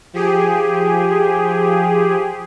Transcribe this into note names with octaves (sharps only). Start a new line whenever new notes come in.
F3 G4 G#4